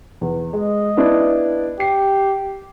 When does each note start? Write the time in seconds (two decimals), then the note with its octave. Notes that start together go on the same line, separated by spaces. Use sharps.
0.21 E2
0.53 G#3 D#5
0.97 B3 D4 E4
1.80 G4 C7